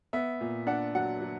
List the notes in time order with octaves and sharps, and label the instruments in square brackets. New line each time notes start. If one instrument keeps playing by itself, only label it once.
[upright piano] B3 E5
A#2
D4 F#5
F#3 F#5
F#3